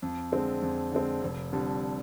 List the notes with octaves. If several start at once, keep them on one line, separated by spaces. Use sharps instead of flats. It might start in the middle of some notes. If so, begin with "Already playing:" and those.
F2
D3 G#3 C4
F2
D3 G#3 C4
F1
F2 D3 G3